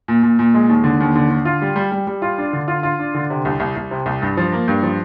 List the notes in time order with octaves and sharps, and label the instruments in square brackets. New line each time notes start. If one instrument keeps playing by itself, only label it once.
[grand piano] A#2
A#2
A#2
G#3
D#2
D3
D#2
D3
D3
F4
G3
G3
G3
G3
F4
D4
D3
F4
F4
D4
D3
C3
C2
C2
C2
C3
C2
G2
F3
A#3
G2
F3